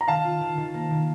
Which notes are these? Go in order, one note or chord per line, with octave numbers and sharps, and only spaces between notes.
A#5
D#3 F5 A5
F4
D#3
D#3
A#3
D#3